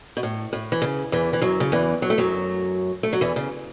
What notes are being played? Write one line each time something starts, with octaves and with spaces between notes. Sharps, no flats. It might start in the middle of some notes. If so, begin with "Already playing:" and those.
B2
A2
A2
E3
C#3
E2 E3
E3
F#2 F#3
C#3
E2 E3
F#3
A3
F#2 F#3
A3
F#3
E2 E3
C#3